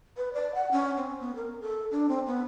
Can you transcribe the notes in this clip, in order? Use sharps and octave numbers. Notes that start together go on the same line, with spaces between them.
B4
D5
F#5
C#4
C4
B3
A#4
A4
D4
C4
B3